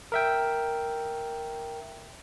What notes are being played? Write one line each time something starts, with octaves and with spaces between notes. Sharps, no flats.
A#4 E5 G5